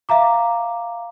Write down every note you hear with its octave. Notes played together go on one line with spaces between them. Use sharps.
E5 F5 A#5 D6